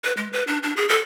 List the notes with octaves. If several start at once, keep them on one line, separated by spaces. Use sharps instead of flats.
B4
G#3
B4
D4
D4
G#4
A4